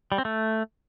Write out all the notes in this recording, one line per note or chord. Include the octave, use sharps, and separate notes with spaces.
G3
C4
A3